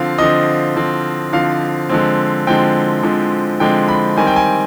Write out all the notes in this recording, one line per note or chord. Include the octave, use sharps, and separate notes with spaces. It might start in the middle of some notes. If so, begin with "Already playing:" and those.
Already playing: D3 F3 C4 F5
D3 F3 C4 D#5
D3 F3 C4
D3 F3 C4 F5
D3 F3 G#3 C4
D3 F3 G#3 C4 G5
D3 F3 G#3 C4
D3 F3 G#3 C4 G5
B5
D#3 G3 C4 G#5
G5
G#5